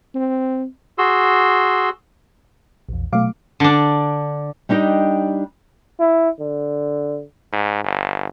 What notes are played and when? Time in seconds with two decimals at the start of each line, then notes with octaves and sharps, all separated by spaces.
0.15 C4
0.98 F#4 G#4 C6 E6
2.89 A#1 E2
3.13 B2 F#3 A3 F5 D6
3.60 D3 D4
4.69 G3 D4 D#4 G4 D#5
6.00 E4
6.39 D3
7.52 G#2
7.84 G1